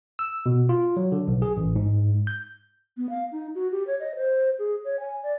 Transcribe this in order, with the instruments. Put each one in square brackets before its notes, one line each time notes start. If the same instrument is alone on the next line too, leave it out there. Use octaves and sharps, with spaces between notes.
[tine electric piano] E6
B2
F4
F#3
D3
B1
G#4
A1
G#2
G6
[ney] B3
F5
D#4
F#4
G4
C#5
D#5
C5
G#4
C#5
G#5
D5